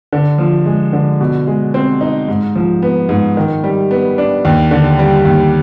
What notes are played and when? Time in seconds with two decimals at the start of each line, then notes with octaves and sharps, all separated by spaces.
0.13 D3
0.38 F3
0.66 G#3
0.93 D3
1.21 B2
1.47 G#3
1.74 C4
2.01 D#4
2.28 G#2
2.55 F3
2.82 B3
3.09 G#2
3.37 D#3
3.64 G3
3.91 B3
4.18 D4
4.45 D#2
4.71 D3
4.99 G3
5.25 D#2